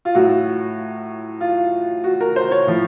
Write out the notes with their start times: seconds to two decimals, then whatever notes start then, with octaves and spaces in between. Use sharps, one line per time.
0.05 F4
0.15 A2 F#3 F#4
1.41 F4
2.04 F#4
2.21 A#4
2.36 C5
2.51 C#5
2.67 A2 F3